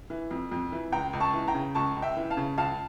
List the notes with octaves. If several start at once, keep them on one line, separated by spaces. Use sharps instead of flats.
E3
F2
F2
E3
C#2 G5 A#5
C#2
A5 C#6
E3
G5 A#5
C#3
C#2 A5 C#6
C#2
E5 G5
E3
F5 A5
C#3
C#2 F5 A5